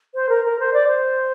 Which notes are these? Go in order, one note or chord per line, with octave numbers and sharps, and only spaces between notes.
C5
A#4
A#4
C5
D5
C5